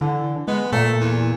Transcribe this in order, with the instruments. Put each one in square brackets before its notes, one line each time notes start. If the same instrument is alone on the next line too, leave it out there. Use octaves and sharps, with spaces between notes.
[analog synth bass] D3 [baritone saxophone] E3
[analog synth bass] G#3 [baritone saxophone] B3
[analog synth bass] A#2 [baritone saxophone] A3
[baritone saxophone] E2